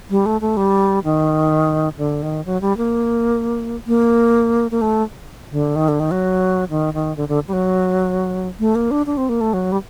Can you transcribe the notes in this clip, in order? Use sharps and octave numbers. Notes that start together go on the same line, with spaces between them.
G3
A3
A3
G3
D#3
D3
D#3
F#3
G3
A#3
A#3
A#3
A3
D3
D#3
D3
D#3
F#3
D#3
D#3
D3
D3
G3
F#3
A3
A#3
D4
D4
C4
A#3
A3
F#3
G3